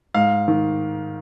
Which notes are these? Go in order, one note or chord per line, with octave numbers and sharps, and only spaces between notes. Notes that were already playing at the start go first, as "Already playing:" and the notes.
G#2 F5
D#3